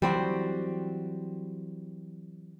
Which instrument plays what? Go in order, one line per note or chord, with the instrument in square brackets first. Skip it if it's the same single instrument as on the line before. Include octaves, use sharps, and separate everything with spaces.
[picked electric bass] E3 F#3 [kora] G3 C4 F#4